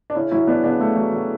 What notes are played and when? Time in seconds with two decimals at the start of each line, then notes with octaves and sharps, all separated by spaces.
0.10 D4
0.15 C#3 C#4 E4
0.31 F#3 C#4 E4
0.47 F#3 B3 D4
0.64 C#3 B3 D4
0.80 C#3 A3
0.96 F#3
1.13 F#3